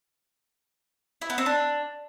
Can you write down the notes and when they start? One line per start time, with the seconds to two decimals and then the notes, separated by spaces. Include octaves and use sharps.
1.22 E4
1.30 B3
1.38 C4
1.46 D4